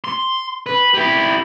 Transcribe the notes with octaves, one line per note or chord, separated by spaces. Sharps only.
C6
B4
E4 G4